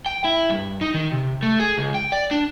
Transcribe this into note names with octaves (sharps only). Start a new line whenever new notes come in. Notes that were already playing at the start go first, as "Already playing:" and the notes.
G5
E4
G2
D#4
D#3
C3
A3
G#4
C#2
G5
D5
D4